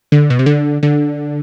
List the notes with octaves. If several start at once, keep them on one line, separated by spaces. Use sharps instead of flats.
D3
B2
C3
D3
D3